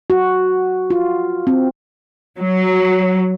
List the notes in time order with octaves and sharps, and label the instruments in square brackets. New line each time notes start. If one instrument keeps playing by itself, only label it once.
[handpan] F#4
F4
C4
[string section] F#3